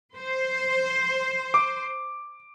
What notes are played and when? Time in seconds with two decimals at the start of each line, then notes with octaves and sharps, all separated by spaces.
0.16 C5
1.54 D6